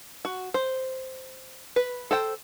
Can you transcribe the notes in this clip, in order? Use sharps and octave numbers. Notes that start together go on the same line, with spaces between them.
F#4
C5
B4
A4 C5 G5